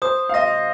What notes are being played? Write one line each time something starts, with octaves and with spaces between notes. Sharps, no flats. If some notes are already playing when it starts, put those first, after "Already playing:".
C5 D#6
F5
D#5 A#6